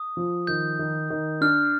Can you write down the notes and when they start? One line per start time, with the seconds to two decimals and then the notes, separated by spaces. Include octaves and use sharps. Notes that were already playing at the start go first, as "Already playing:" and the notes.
Already playing: D#6
0.17 F3
0.47 D#3 G6
0.79 D#3
1.10 D#3
1.41 D4 F6